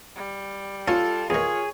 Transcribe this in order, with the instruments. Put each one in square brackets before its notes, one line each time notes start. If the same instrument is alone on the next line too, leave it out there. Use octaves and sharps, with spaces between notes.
[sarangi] G3
[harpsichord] C#4 C#5 [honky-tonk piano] F4 [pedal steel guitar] A4
[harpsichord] E2 D#3 [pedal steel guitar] G#4 [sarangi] C#5